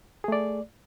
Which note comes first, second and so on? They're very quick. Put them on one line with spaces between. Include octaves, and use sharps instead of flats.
G#4 A3 D5